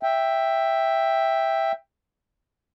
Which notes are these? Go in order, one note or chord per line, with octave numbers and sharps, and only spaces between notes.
E5 G5